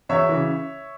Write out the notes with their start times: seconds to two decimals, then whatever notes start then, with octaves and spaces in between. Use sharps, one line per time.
0.09 E2 C#5 E5
0.29 C#3 E3